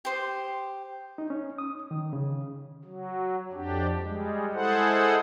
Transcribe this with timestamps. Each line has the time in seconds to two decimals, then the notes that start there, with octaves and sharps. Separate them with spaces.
0.05 G4 C5 D#6
1.18 D#4
1.30 C#4
1.58 D#6
1.91 D#3
2.13 C#3
2.84 F#3
3.52 F2 D4 G4
4.02 G3 G#3
4.53 G#3 E4 G#4 A4 C5 F#5